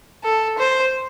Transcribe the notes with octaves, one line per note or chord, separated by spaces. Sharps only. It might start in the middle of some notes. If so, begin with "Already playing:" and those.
A4
C5